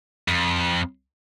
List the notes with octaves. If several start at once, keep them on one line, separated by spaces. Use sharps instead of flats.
F2